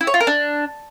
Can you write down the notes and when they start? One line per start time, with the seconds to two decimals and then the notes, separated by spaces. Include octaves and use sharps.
0.01 E4
0.07 C#5
0.14 F4
0.20 A#4
0.27 D4